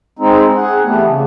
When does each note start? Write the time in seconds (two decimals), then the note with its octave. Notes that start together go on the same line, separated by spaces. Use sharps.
0.19 G#3 C4 D#4
0.56 G#4 F#5
0.84 E3 G3 A3 B3
1.07 C#3